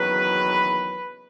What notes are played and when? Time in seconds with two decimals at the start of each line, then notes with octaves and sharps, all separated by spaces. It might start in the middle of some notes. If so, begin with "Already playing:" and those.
Already playing: F#1 E2 D#3 F#3 B4